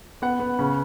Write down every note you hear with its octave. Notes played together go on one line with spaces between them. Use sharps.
B3 F#5
B3
C#3